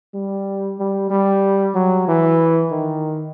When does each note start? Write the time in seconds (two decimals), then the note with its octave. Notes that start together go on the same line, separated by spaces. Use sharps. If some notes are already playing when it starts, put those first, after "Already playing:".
0.14 G3
0.79 G3
1.10 G3
1.74 F#3
2.08 E3
2.71 D#3